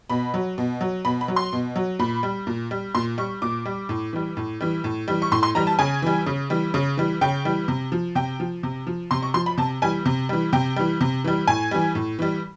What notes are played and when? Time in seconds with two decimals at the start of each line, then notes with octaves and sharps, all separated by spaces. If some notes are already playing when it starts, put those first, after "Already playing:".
0.10 B2 B5
0.34 F#3
0.58 B2
0.81 F#3
1.05 B2 B5
1.21 B5
1.28 F#3
1.36 C6
1.53 B2
1.76 F#3
1.99 A#2 B5
2.23 G3
2.47 A#2
2.71 G3
2.95 A#2 C6
3.18 G3 C#6
3.42 A#2 D6
3.66 G3
3.89 A2
4.13 E3 G3
4.37 A2
4.61 E3 G3
4.84 A2
5.08 E3 G3
5.22 C#6
5.32 A2 C6
5.43 C6
5.55 E3 G3 A#5
5.67 A5
5.79 C#3 G#5
6.02 E3 G3
6.26 C#3
6.50 E3 G3
6.74 C#3
6.97 E3 G3
7.21 C#3 G5
7.45 E3 G3
7.68 C3
7.92 F3
8.15 C3 G5
8.40 F3
8.63 C3
8.87 F3
9.11 C3 C6
9.22 C#6
9.34 F3 C6
9.46 B5
9.58 C3 A5
9.82 E3 G3 G#5
10.06 C3
10.29 E3 G3
10.53 C3 G5
10.76 E3 G3
11.01 C3
11.24 E3 G3
11.47 A2 G#5
11.71 E3 G3
11.95 A2
12.19 E3 G3